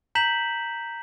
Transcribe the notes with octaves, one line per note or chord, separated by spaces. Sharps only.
A#5 G6 B6 E7 F#7